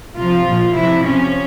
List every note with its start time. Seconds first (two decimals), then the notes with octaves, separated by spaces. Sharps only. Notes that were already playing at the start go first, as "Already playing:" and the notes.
0.17 C3 F3 F4
0.46 A#2 F3
0.75 C3 F3 E4
1.04 C3 F3 C#4